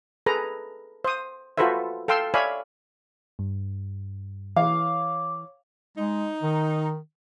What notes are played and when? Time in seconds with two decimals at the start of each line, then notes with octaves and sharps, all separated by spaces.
0.26 G#4 A4 B4 A#5
1.04 C5 D#6
1.58 F4 F#4 A4 B4 C5 E5
2.08 A4 F5 G5 C6 E6
2.34 C#5 D5 E5 F5 G#5 B5
3.39 G2
4.56 E3 C#5 F5 D6
5.98 G#3 D#4
6.43 D#3